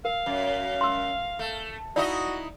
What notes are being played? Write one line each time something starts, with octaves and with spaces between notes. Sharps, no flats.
A#4 F5
F#2
C6 E6
A3
D#4 E4 F#4 D5 D#5 F5